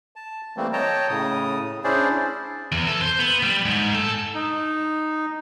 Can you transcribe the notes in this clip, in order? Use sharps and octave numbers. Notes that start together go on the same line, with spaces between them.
A5
E3 G3 A3 A#3 C4
C#5 D#5 G5 A5 A#5
A2 C#3 D#6
C#4 D4 E4 G#4 C5 D5
E2
A4
C5
B3
G3
G#2
A4
D#4